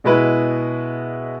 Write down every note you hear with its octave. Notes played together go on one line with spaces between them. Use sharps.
B2 G#3 E4 B4